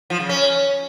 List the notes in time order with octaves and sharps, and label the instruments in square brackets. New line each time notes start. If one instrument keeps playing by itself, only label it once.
[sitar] F3
C#3
C#4